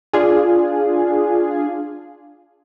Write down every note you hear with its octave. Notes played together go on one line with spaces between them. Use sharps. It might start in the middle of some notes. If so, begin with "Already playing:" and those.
D4 F4 G#4